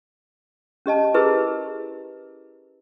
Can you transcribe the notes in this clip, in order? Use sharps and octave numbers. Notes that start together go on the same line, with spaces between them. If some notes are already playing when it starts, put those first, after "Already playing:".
C#4 G4 D#5 A5
E4 G4 G#4 A#4 B4